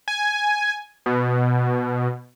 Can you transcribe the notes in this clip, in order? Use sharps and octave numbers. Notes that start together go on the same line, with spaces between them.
G#5
B2